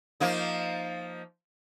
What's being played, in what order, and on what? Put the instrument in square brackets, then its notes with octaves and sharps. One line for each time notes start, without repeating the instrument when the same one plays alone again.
[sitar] F3 A#3 D#4